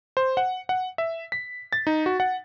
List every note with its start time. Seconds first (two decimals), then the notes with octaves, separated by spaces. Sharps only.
0.17 C5
0.37 F#5
0.69 F#5
0.98 E5
1.32 B6
1.73 A6
1.87 D#4
2.06 F#4
2.20 F#5